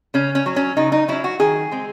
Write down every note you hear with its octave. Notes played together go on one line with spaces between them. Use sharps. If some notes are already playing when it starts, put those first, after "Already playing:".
C#3 C#4
C#4
F#3 C#4
C#4
C#3 D#4
D#4
F#3 C#4 E4
F#4
D#3 G#4
G#3 C4